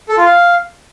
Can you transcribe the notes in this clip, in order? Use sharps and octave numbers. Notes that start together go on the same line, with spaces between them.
A4
F4
F5